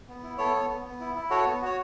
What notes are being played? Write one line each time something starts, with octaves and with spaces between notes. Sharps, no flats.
B3
E4
B3 A4 C#5
B3
B3
B3
E4
E4
F#4 A4 C#5
B3
F#4 C#5